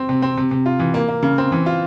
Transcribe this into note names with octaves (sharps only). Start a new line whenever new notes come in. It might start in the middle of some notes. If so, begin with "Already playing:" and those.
Already playing: C4
C3
C4
C3
C3
F4
E3
A#3
A#3
C#3
C4
E3
F4